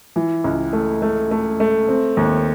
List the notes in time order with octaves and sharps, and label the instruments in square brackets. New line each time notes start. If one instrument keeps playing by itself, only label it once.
[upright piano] E3
C#2
A3
A3
A3
A3
C4
D#2